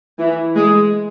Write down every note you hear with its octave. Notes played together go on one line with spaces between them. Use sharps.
E3
G#3